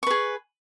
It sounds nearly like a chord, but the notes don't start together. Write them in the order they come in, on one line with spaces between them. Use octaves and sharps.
C#6 B4 G#4